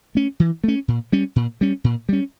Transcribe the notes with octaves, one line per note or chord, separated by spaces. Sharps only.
A3 C#4
E3
A3 C#4
A#2
G3 C#4
A#2
G3 C#4
A#2
G3 C#4